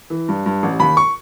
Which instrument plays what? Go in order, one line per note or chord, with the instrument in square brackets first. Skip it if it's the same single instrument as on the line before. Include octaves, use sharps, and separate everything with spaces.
[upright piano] E3
G2
G2
A1
D#2 B5
C#6